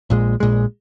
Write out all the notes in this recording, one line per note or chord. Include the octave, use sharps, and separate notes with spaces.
A#1 A#2 G#3
A#1 A#2 G#3